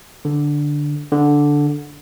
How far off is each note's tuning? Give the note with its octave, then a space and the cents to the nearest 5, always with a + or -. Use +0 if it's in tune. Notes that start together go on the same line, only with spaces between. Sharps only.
D3 +0
D3 -5